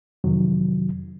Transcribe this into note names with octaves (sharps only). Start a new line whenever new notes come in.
F2 C3 D#3 F#3